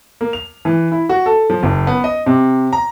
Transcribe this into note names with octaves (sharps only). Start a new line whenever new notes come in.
A#3
F7
E3
E4
F#4
A4
F3
F#1
B3
D#5
C3
A#5